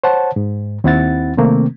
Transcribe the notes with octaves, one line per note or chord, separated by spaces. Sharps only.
C5 C#5 F#5 A5
G#2
D#2 C4 E4 F#5 A6
C3 D#3 A3 A#3 C4